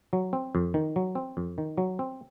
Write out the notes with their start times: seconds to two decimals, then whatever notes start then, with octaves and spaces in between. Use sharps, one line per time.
0.13 F#3
0.33 C4
0.55 F2
0.74 D#3
0.96 F#3
1.15 C4
1.37 F2
1.58 D#3
1.78 F#3
1.99 C4